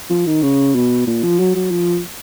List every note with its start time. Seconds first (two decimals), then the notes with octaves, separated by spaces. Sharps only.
0.10 F3
0.26 D#3
0.43 C#3
0.75 B2
1.07 A#2
1.23 F3
1.39 F#3
1.55 F#3
1.71 F3